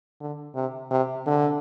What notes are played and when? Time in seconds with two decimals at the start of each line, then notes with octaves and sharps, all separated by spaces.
0.21 D3
0.55 C3
0.91 C3
1.26 D3